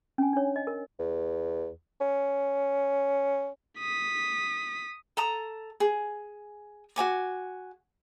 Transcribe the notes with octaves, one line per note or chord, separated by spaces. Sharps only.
C#4 G#5
D4 C#5
D#5
A#4
E2
C#4
D#6 B6
A4 A#5 D#6
G#4
F#4 C#5 G#5 D6